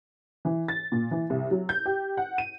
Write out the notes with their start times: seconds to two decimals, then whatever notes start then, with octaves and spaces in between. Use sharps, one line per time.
0.45 E3
0.68 A6
0.92 A#2
1.11 E3
1.30 C2
1.51 F#3
1.69 G6
1.86 G4
2.17 F#5
2.38 D#7